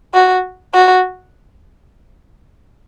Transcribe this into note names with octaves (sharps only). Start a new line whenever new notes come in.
F#4
F#4